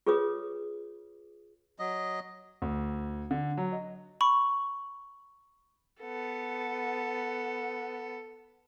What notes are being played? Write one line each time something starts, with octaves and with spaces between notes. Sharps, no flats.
F4 G#4 B4 C#5 D#6
F#3 D#5
D2
D3
F#3
D#5
B5 C#6
B3 A4